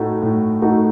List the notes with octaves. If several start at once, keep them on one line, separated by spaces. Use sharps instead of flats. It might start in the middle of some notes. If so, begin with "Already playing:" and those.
Already playing: A2 A3 D#4 F#4
A2
A3 D#4 F#4